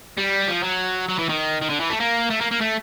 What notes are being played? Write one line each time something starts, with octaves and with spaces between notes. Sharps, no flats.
G3
F3
F#3
F#3
E3
D#3
D#3
D3
E3
A3
A#3
A3
A#3
A#3
A3